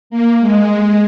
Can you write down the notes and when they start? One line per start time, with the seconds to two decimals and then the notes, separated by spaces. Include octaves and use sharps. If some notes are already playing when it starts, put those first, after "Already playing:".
0.10 A#3
0.40 G#3